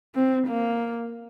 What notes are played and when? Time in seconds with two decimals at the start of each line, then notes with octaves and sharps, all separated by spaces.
0.15 C4
0.47 A#3